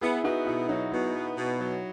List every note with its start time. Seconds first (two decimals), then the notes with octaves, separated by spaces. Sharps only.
0.01 B3 E4 G#4
0.24 B3 D#4 F#4
0.46 B2 E4
0.69 F#3 D#4
0.92 B2 E4
1.15 B3
1.37 B2
1.59 F#3